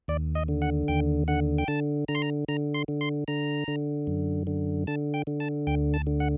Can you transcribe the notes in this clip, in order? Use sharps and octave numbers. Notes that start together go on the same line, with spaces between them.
D#2 D5
D#5
D3
F#5
D#2 G5
D3 F#5
G5
D3 A5
D3 A#5
C6
A#5
D3 A#5
C6
D3
C6
D3 A#5
D3
F#2
D3
D3 A5
G5
D3
A5
D2 G5
A5
D3
F#5